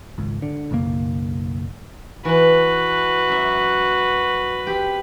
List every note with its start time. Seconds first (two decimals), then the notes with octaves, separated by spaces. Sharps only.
0.18 G#1 C#2
0.42 D3
0.71 B1 F#2 C#3 A#3
2.25 E3 F#4 B4
3.28 F#2 E5
4.67 C4 G4